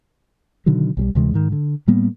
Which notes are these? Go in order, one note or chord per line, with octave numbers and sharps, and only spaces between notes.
B2 D3 D#3 F#3
B1 F#3 G3
D2 C3 E3 G#3
G#2 D#3
D3
A2 G3 A#3 B3